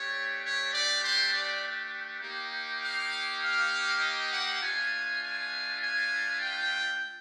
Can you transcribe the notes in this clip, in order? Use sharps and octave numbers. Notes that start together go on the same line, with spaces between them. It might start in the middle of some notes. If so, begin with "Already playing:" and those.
Already playing: A3 D4 G4 C#5
C#5
D5
C5
D5
A#3 D#4 G4
F5
F5
D#5
F#5
A3 D4 F4 G#5
G#5
G#5
G5